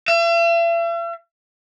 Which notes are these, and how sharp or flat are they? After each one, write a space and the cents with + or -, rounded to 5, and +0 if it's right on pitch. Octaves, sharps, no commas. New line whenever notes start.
E5 +45